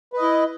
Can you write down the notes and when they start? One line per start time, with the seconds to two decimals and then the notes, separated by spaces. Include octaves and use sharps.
0.13 B4
0.18 D#5
0.22 E4